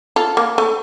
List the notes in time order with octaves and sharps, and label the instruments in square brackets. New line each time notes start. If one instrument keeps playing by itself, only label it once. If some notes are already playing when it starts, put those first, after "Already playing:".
[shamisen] F4 A4
A#3
A3